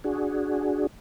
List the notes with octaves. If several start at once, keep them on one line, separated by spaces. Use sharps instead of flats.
D4 F#4 G#4